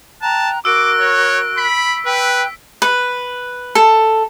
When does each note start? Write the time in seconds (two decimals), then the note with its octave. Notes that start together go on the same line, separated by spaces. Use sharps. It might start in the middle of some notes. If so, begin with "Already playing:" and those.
0.22 G5 A5 A#5 F#6
0.65 F#4 A#4 D6 E6 F#6 D7
1.00 C#5
1.58 B5 B6
2.06 B4 G5 E6 F#6
2.82 B4
3.75 A4